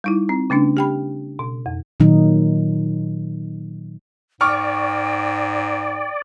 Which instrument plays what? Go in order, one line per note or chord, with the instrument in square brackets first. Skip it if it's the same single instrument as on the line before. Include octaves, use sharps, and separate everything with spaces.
[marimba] G3 D#4 E4
C4
C#3 A3 C#4 D4
G4 G5 B5
B2
F2
[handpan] A#2 D#3 F#3 D#4
[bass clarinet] G#2 [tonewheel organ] D5 [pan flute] G5 [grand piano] C#6 D6 F6